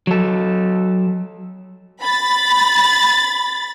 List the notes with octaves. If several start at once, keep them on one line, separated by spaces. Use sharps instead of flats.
F#3 A4
B5 A6